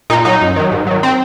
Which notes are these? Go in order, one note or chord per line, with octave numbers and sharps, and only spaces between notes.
A#2 D#4
F#3 D#4
F#2
D#3 F#3
G#2
D#3 F#3
C4